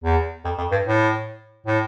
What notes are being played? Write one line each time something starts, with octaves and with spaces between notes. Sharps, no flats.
E2
F2
F2
G2
A2
A2